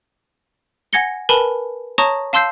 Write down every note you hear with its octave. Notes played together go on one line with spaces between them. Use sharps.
F#5 G#5 G#6 A#6 C#7 G7
A#4 B4 G#5 A5 B5
C#5 A5 A#5 C#6 D#6 A#6
F5 A5 C6 E6 G6 C7